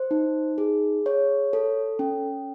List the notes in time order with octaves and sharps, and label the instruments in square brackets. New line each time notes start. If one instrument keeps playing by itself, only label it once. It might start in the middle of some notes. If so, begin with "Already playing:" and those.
Already playing: [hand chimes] C5
D#4
G#4
C#5
A4
C#4